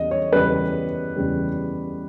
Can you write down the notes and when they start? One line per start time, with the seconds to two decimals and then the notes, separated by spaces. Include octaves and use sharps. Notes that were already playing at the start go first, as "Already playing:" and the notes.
Already playing: E2 C#3 G3 D#5
0.11 C#5
0.33 E2 C#3 G3 B4
1.16 E2 C#3 G3